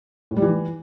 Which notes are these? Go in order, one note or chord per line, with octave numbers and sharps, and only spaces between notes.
A2
G3
E3